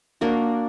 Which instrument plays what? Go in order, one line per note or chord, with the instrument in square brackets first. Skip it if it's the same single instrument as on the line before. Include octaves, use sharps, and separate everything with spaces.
[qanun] A#3 D4 F#4 A#4